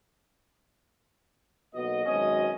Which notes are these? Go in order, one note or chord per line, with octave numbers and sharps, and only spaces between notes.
B1 A#3 B3 F#4 D#5
G#1 F#2 B2 C4 C#4 D#5